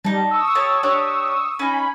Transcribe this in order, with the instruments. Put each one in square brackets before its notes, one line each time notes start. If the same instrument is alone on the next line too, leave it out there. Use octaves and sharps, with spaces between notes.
[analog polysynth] G3 [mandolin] D#4 A5
[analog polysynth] C#6 D#6 E6
[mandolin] G4 C#5 A5
D4 G4 C#5
[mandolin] C#4 D#4 [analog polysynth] G#5 B5